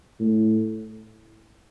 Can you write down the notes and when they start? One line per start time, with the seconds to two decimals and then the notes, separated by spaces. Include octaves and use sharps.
0.19 A2